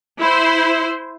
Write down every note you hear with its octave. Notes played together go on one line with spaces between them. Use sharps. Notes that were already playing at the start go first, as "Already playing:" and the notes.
E4 C5